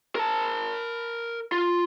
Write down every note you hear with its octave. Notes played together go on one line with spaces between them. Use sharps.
A#4 A5
F4